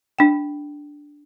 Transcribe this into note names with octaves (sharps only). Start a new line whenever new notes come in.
D4 G5